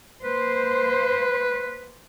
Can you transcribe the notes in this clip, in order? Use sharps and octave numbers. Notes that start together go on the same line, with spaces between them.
A#3 B4 C5